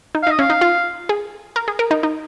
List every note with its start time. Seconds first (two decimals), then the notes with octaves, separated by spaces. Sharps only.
0.15 D#4
0.23 F5
0.27 D#4
0.31 D#5
0.39 C#4 F5
0.50 D#4
0.61 F4
1.09 G#4
1.56 A#4
1.68 G#4
1.79 A#4
1.91 D#4
2.03 D#4